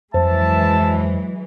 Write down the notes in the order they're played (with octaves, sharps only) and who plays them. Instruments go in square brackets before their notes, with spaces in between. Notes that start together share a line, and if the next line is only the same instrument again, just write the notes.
[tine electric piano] F2 [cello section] E3 F#3 G#3 [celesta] C5 [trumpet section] E5 A5